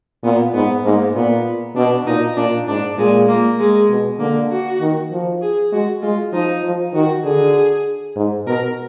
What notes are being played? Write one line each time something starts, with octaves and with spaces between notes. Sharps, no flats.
A#2 B3
G#2 B3
G#2 A#3
A#2 B3
B2 D4
A#2 D#4
A#2 D4
G#2 D4
A#2 G#3
A#3
G#3
B2
D3 A#3
F#4
D#3
F3
G#4
G#3 F#4
G#3 F4
F3 D#4
F3
D#3 F#4
D3 G#4
G#2
B2 A#4